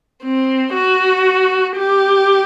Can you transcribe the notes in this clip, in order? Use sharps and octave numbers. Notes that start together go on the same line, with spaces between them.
C4
F#4
G4